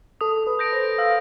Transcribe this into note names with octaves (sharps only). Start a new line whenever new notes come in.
A4 D#6
B4
G6 A#6 D7
C5
F5 E6